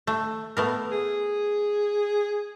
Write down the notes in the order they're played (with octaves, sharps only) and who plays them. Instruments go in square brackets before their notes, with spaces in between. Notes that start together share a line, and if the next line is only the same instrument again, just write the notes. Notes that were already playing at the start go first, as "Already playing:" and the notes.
[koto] A3
A3 B3 A#4
[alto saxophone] G#4